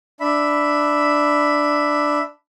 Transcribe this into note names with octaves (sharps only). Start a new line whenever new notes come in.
D4 E5 B5